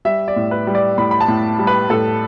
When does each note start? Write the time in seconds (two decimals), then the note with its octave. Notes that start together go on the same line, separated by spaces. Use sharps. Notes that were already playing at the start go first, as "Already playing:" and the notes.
0.05 G3 E5
0.28 D5
0.36 A2
0.51 B4
0.67 G3
0.75 D5
0.98 A2 B5
1.11 B5
1.20 A5
1.28 A2
1.59 G3
1.67 B4
1.90 A2 A4